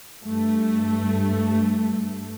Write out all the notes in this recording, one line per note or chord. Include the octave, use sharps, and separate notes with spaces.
G2 A3